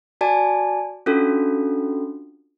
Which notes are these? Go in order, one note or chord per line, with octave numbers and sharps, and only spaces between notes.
F#4 D5 G#5 A5
C#4 D4 F4 F#4 A4